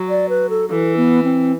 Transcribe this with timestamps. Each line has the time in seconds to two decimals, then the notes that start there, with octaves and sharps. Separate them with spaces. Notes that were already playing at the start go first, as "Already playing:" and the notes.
Already playing: F#3
0.09 D5
0.29 B4
0.50 A4
0.70 E3 A4
0.97 B3
1.24 C4